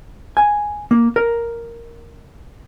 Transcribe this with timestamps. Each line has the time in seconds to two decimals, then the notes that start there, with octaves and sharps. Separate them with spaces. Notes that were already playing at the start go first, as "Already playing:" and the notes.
0.37 G#5
0.91 A#3
1.16 A#4